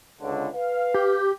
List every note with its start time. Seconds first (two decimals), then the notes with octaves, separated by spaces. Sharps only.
0.21 C#2 D3
0.53 B4 F5
0.94 G4